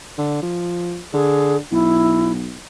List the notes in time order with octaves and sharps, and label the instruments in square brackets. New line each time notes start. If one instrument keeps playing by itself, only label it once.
[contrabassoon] D3
F3
[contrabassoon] D3 [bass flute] G#4
[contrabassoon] B1 [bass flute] E4